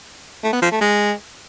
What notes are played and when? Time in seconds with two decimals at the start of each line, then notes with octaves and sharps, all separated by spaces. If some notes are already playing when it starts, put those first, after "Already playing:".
0.43 A3
0.52 B3
0.62 F3
0.71 A3
0.81 G#3